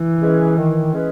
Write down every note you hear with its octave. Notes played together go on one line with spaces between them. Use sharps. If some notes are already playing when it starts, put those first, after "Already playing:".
Already playing: E3
G#3 C#4 G#4 B4
D#3
G#3 C#4 G#4 B4